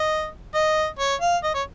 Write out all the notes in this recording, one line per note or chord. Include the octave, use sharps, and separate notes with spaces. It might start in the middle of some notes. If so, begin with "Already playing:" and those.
Already playing: D#5
D#5
C#5
F5
D#5
C#5